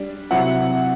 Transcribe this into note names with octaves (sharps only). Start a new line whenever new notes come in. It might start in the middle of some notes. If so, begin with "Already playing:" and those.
Already playing: G3 D4
C3 F#3 C4 E4 F#5